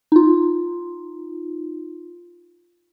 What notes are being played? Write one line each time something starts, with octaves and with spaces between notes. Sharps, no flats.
D#4 F4